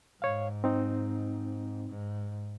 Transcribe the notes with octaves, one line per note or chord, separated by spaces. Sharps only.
G#2 C#5 F5
C4 D#4
G#2